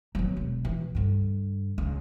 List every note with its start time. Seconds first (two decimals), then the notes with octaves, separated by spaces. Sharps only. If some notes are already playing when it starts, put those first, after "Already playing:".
0.15 F#3 B3
0.37 E1
0.65 E3
0.95 G2 D3
1.78 C#2